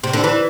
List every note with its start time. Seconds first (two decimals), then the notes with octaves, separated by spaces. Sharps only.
0.04 C3
0.13 D3
0.24 E3